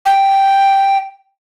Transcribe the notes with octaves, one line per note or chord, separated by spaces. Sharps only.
G5